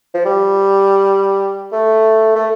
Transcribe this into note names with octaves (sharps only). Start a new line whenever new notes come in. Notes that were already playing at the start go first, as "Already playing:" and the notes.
F3
G3
A3
A3